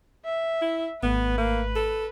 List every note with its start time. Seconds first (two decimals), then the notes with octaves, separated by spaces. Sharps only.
0.25 E5
0.62 E4
1.03 G#1 A3 B3 B4
1.38 A#3
1.76 A4